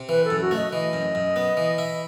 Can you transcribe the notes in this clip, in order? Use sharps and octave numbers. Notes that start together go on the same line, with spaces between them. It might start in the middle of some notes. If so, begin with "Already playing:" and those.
Already playing: C3
E3 B4
A4
F#2
F#4
A3 D#5
E3 D#5
F#2
F#2
B3
E3
E4